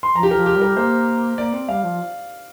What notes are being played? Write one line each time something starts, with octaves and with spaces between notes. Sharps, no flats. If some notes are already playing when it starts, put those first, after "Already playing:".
C6
F3 A#5
G4
A#4
F3
G4
G3
A#4
A#3 C5
A#3 D5
C4
G3 F5
F3